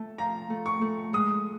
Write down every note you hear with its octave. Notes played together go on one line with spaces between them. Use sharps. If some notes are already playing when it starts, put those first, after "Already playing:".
Already playing: A3 A5
F3 A#5
A3
C#6
A3
G#3 D#6